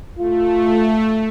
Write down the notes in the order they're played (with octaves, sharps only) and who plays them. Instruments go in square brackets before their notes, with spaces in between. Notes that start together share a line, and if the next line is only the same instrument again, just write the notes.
[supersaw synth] A3 [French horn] F4